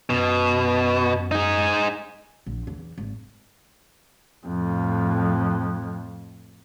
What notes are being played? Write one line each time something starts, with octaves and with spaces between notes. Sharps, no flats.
F#2 B2
D#4 G#4
A#1
E2
G#1
F2 A2